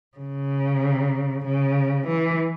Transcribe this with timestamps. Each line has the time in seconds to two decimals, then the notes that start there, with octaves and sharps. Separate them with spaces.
0.17 C#3
1.45 C#3
2.07 E3